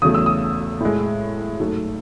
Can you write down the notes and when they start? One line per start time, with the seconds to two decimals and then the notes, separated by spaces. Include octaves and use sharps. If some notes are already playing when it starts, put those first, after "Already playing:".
0.02 E2 C#3 F#3 A3 D#6
0.14 E6
0.26 D#6
0.80 A2 G#3
1.60 G#2 F#3 A3